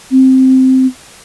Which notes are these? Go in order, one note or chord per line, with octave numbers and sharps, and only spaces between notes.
C4